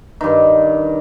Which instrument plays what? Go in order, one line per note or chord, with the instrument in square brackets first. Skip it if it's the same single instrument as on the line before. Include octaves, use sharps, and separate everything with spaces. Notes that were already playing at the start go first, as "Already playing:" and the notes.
[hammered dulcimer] G2 D#3